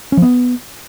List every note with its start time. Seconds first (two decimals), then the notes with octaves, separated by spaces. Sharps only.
0.12 C#4
0.17 F3
0.22 B3